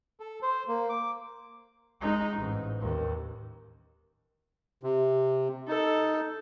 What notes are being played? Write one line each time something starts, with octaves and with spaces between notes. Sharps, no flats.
A4
C5
A#3
D6
G#3 D#4
A1 G#2
D#2
C3
D#4 A4